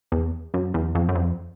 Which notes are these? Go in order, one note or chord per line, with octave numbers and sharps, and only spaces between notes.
E2
F#2
E2
F2
F#2
F2